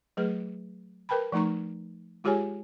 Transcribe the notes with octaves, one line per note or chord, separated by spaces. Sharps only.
F#3 A3 G#4 B4
A#4 B4 G5 A5 B5
F3 A3 D#4 A#5 C#6
G#3 F4 G4 G#4 C#5 G#5